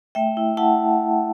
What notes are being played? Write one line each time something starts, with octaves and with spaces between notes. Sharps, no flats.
A3 E5 G5
E4
E4 F#5 A5